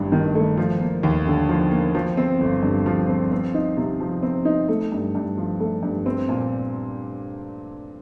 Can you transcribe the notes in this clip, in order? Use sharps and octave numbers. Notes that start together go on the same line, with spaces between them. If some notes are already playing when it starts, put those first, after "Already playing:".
Already playing: A1 G2 D#3
D#3
A3
F3
A#3
D#2
D3
F3
A#3
F3
C4
G1
G2
F3
C4
C4
D#4
C3
F3
C4
D#4
A3
G2
G2
F3
A3
G2
C4
A#2